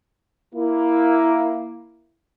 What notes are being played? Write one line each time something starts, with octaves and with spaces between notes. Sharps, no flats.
A#3 E4